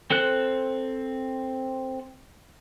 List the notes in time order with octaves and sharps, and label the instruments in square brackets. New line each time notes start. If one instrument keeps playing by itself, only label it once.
[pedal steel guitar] C4 A4 C5 F#6